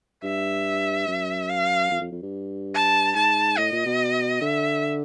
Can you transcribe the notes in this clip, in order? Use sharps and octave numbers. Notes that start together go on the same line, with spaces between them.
G2 E5
F#2
F5
F2
F2
F2
G2
A5
G#2 A5
A2 D#5
A#2
B2
D3 E5